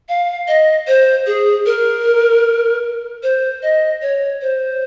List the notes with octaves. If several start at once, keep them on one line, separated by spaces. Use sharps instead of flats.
F5
D#5
C5
G#4
A#4
C5
D#5
C#5
C5